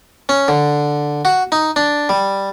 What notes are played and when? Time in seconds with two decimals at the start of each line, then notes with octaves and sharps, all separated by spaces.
0.29 C#4
0.48 D3
1.25 F#4
1.52 D#4
1.76 D4
2.09 G3